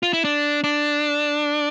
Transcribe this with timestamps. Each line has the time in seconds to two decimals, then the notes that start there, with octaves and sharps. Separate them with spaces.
0.03 F4
0.13 E4
0.24 D4
0.64 D4